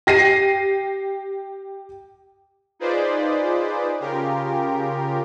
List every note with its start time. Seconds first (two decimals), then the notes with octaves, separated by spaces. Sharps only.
0.07 G4 A#6 C7 D#7
2.79 D#4 F4 G#4 B4 C5 D5
4.00 C#3 F4 G4 A#4